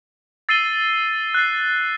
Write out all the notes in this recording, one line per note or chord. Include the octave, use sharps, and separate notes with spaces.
E6 A6 C7 D#7 G7
F#6 A6 C7